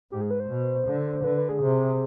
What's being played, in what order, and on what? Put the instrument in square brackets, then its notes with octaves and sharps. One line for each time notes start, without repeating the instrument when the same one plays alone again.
[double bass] G#2 [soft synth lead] G4
[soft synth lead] G#4
B4
C5
[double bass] B2
D3
[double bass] D3 [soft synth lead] B4
[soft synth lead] B4
G#4
[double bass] C3